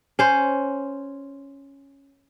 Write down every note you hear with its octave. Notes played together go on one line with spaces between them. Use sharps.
C#4 C5